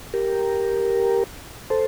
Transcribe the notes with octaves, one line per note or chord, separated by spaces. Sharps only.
G4 A#4
A4 C5